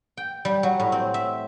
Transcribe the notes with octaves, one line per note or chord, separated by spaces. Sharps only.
G5
G3
F#3
A2
C4
E5